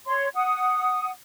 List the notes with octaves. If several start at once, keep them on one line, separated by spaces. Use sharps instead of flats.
C#5 C6
F#5 D#6